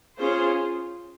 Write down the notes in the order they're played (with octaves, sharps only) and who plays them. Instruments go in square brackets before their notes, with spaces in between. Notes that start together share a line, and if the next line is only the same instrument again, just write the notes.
[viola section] C#4 F4 G#4 C5